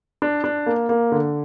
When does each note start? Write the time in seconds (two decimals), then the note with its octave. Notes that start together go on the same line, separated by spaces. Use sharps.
0.22 D4
0.44 D4
0.66 A#3
0.89 A#3
1.12 D3